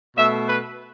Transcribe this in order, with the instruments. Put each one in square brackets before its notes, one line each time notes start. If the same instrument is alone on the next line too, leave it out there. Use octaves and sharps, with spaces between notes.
[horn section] B2 A3 E5
B4